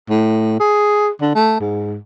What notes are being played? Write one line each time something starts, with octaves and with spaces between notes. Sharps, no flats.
A2
G#4
D3
A3
G#2